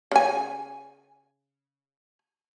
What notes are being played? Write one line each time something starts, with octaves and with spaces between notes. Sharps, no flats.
C#3 G#5